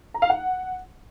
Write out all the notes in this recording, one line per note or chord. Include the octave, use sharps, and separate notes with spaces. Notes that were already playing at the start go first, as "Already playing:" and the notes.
A#5
F5
F#5